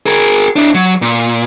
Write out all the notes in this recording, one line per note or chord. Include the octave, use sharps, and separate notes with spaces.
G#4 A#4
D4 E4
F#3
A#2